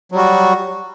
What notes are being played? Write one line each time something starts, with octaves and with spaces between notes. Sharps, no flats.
F#3 G3 F#4